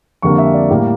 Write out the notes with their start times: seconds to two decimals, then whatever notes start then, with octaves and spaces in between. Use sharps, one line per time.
0.22 F2 D3 G3 A#3 C#6
0.38 E5
0.54 D5
0.70 A2 G3 A#3